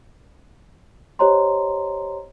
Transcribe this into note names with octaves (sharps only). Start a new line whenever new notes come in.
G4 C5 C#5 D#5 A#5 C6